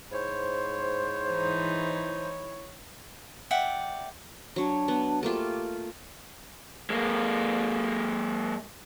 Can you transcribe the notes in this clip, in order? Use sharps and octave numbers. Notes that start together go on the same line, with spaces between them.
G#2 E4 C5 C#5
E3 D#4
D5 E5 F#5 G5
F#3 D4 C#5
B3
A3 A#3 F4 G4
G#3 A#3